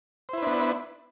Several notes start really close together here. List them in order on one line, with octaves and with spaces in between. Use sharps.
C5 E4 B4 D4 B3